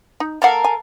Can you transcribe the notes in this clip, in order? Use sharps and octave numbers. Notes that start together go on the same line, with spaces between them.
D#4
A#3 A4 A#4 F5 F#5
G#5